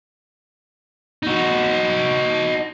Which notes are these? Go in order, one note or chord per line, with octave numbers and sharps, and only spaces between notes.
D#4 F#4